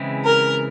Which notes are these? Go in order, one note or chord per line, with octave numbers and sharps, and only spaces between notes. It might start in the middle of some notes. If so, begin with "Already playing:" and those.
Already playing: C#3 E3 G#3 C4 E4
A#4